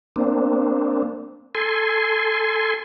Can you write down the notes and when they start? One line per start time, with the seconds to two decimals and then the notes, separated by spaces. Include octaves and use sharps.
0.16 A#3 C4 D4
1.55 A4 G#5 C6